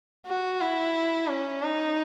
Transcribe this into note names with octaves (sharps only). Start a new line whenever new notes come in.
F#4
E4
C#4
D#4